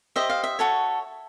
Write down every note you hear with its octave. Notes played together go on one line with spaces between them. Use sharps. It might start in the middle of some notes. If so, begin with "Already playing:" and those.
G4 C5 D#5 E5
F5
E5
F#4 A4 C#5